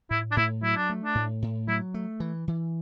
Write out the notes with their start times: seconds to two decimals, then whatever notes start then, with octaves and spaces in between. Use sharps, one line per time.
0.11 A2 E4
0.32 D4
0.37 A2 E4
0.62 F#3 E4
0.76 D4
0.90 A3
1.04 D4
1.15 A2
1.42 A2
1.68 F#3 E4
1.94 A3
2.20 E3
2.48 E3